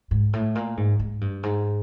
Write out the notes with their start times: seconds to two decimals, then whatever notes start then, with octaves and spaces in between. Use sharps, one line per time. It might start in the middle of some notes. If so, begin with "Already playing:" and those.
0.11 G#2
0.33 A2
0.55 A#2
0.77 G#2
0.99 G#2
1.21 G2
1.43 G#2